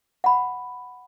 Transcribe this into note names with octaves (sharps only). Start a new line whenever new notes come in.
F#5 B5